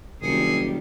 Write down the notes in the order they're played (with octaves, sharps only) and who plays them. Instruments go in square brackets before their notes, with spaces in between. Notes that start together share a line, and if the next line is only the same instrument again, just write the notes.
[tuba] F#1 [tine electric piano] C3 C#7 [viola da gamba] D#3 G3 [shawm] G#4